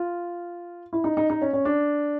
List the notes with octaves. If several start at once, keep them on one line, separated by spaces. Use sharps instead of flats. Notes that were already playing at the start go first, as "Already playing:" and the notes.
Already playing: F4
E4
D#4
D#4
D#4
C#4
C#4
D4